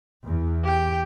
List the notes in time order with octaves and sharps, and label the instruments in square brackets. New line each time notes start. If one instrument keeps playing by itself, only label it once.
[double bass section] E2
[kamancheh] G4 G5